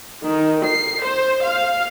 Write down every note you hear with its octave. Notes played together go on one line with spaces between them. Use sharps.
D#3
C7
C5
F5